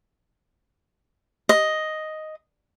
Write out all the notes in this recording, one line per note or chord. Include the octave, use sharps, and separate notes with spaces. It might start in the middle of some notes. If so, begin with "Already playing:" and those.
D#5